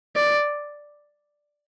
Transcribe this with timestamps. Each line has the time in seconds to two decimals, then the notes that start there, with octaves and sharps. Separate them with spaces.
0.16 D5